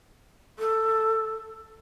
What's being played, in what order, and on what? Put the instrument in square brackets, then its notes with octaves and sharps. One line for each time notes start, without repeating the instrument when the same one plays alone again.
[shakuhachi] A4